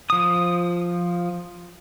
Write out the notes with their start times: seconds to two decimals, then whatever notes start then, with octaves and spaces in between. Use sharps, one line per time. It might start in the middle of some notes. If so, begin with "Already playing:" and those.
0.10 F3 D#6